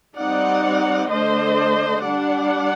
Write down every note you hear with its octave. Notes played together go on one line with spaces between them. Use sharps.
G3 C4 D#4 D5 F#5
D3 A3 D4 C5 D#5
G3 D4 D5 F#5